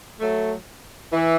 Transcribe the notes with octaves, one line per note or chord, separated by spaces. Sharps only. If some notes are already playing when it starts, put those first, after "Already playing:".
F#3 A3
E3